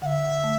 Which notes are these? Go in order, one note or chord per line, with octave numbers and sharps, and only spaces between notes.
D3 E5 F#5
A3